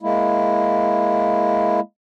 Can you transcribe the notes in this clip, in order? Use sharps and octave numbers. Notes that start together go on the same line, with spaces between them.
G#3 A#3 E4